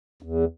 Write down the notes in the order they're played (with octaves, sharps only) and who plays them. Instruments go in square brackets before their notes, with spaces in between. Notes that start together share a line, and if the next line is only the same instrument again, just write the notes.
[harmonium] E2